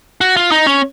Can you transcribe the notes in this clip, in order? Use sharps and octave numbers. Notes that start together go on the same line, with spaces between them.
F#4
F4
D#4
C#4